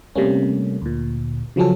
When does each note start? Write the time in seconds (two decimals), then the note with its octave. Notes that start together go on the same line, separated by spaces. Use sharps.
0.15 C3 G3 A3 A#3 C#4
0.82 D2 A#2
1.56 C#3 F3 F#3 C#4 A4